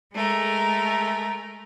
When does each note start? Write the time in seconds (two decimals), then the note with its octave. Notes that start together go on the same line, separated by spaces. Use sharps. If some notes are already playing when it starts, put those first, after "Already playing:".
0.12 G#3 A3 A#4